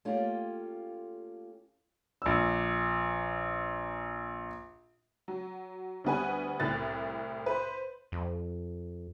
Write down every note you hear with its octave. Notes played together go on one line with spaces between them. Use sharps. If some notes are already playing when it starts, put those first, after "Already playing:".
A3 A#3 C#4 F4 G4
A#1 E6
F#3
D2 G3 B3 B4 G#5
C2 A2 F#6 A6
B4 C5
F2